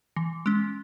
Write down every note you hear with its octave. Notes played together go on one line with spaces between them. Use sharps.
E3
G#3 C#4